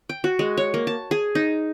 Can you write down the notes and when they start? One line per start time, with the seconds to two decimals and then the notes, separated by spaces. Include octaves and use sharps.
0.09 G5
0.24 F#4
0.39 G#3
0.57 C#5
0.74 A#3
0.87 A5
1.11 G#4
1.35 D#4